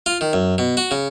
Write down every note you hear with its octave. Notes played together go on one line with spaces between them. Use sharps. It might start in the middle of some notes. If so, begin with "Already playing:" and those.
F4
D#3
F#2
B2
F#4
C#3